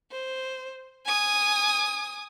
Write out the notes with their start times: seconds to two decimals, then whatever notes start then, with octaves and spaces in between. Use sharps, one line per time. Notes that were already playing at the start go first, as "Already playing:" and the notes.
0.12 C5
1.05 G#5 D#6